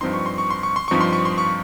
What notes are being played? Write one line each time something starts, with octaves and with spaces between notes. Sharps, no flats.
G2 F3 C4 D#4 C6
C#6
C6
C#6
C6
C#6
C6
G2 F3 C4 D#4 C#6
C6
C#6
C6
C#6